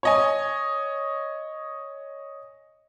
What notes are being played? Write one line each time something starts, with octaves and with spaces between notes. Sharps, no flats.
C#5 D#5 G#5